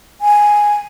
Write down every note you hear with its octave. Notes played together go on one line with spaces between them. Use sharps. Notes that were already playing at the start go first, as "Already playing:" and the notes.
G#5